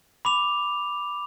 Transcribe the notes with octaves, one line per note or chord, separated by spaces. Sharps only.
B5 D6 F7